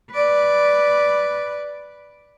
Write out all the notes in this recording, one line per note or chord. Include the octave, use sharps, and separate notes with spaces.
B4 D5